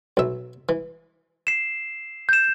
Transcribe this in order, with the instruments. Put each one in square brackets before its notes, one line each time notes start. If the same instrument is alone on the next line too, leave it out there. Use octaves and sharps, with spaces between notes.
[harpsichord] B1 E5
E3
[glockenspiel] C7 E7
G6 E7